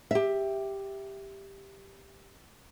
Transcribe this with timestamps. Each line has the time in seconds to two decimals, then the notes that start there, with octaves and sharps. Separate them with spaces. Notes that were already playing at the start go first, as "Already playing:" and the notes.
0.11 G4 E5